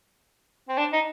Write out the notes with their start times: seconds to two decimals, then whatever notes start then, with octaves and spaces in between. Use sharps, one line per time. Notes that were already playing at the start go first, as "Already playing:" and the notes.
0.69 C4
0.77 D4
0.93 D#4